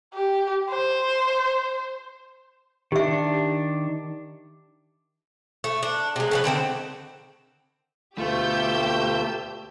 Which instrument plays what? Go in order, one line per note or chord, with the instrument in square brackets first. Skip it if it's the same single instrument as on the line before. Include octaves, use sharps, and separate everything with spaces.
[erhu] G4
C5
[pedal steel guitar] D#3 D4 [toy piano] G4 E5
[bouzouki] A3
D4
C3 G#3
C#3 F3 B4
D3 D#3 C4 C5
[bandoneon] D2 B2 F4 [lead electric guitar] A3 [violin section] G4 E6 G6